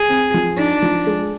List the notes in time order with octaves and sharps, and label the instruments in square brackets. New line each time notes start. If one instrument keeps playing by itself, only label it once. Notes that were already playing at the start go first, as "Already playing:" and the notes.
Already playing: [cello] G#4
[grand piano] C4
F3
[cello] D4 [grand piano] D#4
[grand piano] F3
G#3